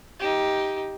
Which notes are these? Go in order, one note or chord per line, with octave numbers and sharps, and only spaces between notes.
D#4 G4